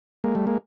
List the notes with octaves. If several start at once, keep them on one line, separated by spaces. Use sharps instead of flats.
G#3 A#3
G3 A3
G#3 A#3